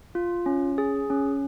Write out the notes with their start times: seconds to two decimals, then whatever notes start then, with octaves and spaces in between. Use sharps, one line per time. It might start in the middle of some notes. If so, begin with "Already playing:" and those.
0.15 F4
0.46 C#4
0.78 G#4
1.10 C#4